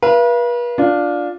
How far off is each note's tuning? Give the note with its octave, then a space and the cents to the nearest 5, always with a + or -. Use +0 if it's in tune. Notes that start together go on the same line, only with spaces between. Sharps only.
B4 -40 F5 -40
D4 +0 F4 +15 D5 +0